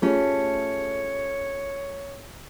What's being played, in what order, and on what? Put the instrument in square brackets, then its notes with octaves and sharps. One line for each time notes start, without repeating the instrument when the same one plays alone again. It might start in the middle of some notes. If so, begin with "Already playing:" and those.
[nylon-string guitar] A3 C#4 [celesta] F4 G4 G#4 [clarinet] C#5